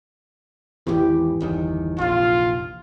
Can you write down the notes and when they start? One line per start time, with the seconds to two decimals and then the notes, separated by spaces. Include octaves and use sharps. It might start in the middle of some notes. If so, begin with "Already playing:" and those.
0.87 G#1 E2 E3 G4
1.40 G1 E2 D#3
1.98 F1 A#1 F4